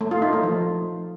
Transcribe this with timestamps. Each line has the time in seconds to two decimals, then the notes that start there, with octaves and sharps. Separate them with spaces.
0.01 A3
0.11 F4
0.22 D#4
0.33 A3
0.43 F3